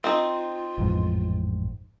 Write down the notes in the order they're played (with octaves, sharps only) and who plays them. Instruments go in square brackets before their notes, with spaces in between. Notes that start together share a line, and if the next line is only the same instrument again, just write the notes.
[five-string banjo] C4 D#4 [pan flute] F4
[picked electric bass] A1 F2 G#2